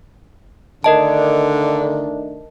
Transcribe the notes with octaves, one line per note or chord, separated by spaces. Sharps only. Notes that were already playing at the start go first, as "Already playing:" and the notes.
D3 D#3 A3 D4 A#4 D#5 A5